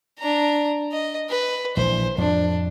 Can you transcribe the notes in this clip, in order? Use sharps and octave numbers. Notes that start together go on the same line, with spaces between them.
D4 A#5
D#5
B4
A#1 E3 C5
F2 A2 F3 D4